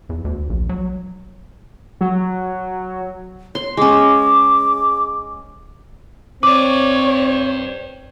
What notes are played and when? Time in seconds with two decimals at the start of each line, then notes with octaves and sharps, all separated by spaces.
0.09 E2
0.25 D2
0.50 A#1
0.69 F#3
2.01 F#3
3.55 C#5 C6
3.77 G#3 C#4 D6
6.43 C4 B4 C#5 D5 D6